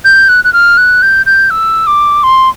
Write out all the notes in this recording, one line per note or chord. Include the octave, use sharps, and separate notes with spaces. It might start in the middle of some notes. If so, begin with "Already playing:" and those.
G6
F#6
F#6
F6
F#6
G6
G6
E6
D6
C6